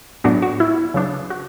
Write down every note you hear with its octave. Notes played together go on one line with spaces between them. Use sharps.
A2 F#3 B3 D4 F#4
F#4
E4
C#3 F#3 B3 D4
F#4